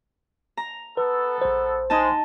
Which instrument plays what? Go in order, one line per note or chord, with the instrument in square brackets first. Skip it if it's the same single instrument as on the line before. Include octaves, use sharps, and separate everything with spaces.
[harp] A#5
[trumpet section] B3 A4 [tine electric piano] B4
[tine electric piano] A#1 C5
[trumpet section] G#3 [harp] D#4 A5